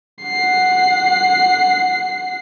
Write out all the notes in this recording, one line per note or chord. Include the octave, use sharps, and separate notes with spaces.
F#5 C7